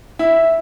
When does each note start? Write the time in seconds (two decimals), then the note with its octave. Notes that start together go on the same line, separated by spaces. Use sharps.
0.19 E4